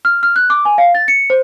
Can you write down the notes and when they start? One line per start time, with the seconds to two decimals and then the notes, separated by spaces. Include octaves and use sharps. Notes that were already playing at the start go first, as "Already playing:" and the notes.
0.05 F6
0.23 F6
0.36 F#6
0.50 D6
0.65 G#5
0.78 F5
0.95 A6
1.08 C#7
1.30 C5